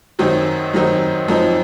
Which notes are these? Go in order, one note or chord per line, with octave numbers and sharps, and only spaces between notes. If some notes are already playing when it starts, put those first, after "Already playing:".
F#2 D#3 F#3 C4 D#4
F#2 D#3 F#3 C4 D#4
F#2 F3 C4 D#4